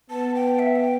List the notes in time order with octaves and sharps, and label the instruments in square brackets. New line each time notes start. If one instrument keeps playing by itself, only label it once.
[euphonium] B3 [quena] A5
[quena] G5
E5
G5